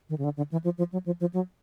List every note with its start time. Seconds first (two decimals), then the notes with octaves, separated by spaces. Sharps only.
0.09 D#3
0.18 C#3
0.24 D3
0.37 D3
0.52 E3
0.64 F3
0.78 F3
0.93 F#3
1.06 F3
1.20 F3
1.34 F#3